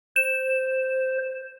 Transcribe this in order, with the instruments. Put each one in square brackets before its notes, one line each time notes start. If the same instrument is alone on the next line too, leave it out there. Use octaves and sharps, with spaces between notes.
[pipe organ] C5 [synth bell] E7